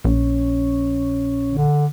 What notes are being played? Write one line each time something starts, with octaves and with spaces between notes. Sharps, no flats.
A#1 C#4
D3